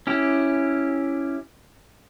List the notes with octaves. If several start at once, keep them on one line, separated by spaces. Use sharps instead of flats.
C#4 E4 G4